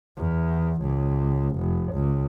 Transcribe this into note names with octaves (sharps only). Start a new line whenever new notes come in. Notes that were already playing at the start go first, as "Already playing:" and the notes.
E2
C#2
F1
C#2